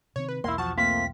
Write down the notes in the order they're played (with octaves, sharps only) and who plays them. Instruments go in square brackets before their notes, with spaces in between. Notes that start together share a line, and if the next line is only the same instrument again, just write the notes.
[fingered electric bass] C3 D#3 C4 [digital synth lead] C#5
[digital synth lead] B4
[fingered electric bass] B1 E2 [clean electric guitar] A#3 E4 [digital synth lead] C6
[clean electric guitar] F3 F#4 [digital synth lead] A5
[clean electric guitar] A3 C4 F4 [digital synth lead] A#3 [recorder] B6